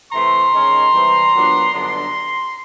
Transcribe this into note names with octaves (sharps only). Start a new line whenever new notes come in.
C3 E3 A3 A#5 C6
D#3 G#3 C#4
C3 E3 G3 C4
A#2 F#3 B3 D4
F#2 D3 G3 B3 D4 A#5 C6